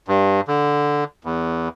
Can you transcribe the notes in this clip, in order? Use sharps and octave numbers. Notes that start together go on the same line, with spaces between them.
G2
D3
E2